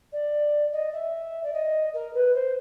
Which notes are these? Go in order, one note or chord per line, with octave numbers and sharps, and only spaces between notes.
D5
D#5
E5
D5
D#5
A#4
B4
C5